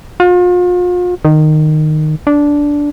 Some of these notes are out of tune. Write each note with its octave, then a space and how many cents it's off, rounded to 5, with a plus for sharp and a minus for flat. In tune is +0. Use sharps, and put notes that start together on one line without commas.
F4 +40
D#3 -15
D4 -10